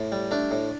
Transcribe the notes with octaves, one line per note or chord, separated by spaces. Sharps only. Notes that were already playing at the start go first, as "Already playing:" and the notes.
Already playing: A2
G3
A3 D4
A2